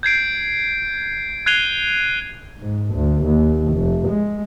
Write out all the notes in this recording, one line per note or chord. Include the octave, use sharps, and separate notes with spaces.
G6 G#6 C7 D7
F#6 G#6 C7 D#7 F7 G7
G#2
D2
D#2
F1
G#3